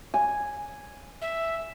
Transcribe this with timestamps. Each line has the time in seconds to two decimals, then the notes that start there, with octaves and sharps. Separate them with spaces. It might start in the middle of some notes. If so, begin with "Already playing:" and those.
0.14 G#5
1.21 E5